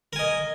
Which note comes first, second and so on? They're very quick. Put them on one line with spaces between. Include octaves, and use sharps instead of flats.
A#4 G#5 D#5